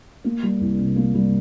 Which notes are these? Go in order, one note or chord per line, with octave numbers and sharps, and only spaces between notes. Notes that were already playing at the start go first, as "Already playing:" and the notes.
A#3
G3
C2
C3
A#3
G3